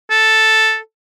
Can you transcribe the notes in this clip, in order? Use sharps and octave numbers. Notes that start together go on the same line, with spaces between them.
A4